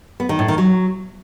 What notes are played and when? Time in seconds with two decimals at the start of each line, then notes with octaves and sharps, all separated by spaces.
0.20 B3
0.29 D#3
0.39 A2
0.48 D#3
0.58 F#3